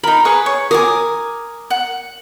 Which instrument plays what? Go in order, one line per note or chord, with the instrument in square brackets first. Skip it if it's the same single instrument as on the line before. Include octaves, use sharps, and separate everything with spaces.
[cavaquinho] D#4 A#4 [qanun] B5
[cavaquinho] G#4 B4 C#6
C#5
[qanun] A#4 [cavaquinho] G#5 D6 D#6
[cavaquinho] F#5